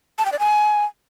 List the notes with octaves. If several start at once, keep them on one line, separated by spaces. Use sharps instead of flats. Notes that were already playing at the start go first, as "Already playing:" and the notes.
A5
G5
D5
G#5